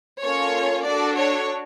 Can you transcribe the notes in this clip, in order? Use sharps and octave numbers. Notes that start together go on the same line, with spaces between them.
A#3 C#4 F4 A4 C#5
D4 F#4 A4 D5
C#5